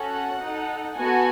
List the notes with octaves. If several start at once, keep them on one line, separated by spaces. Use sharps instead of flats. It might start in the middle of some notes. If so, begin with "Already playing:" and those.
Already playing: C#4 F#4 A4 F#5
D#4 A4
B3 F#4 A4 G#5